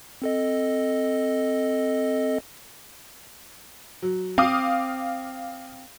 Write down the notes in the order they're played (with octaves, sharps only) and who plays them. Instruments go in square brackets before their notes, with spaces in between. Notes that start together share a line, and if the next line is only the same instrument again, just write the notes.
[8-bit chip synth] C4 A4 D#5
[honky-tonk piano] F#3
[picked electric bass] C4 [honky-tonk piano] F5 D6 D#6